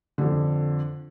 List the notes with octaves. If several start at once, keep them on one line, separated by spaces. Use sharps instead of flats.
F2 D3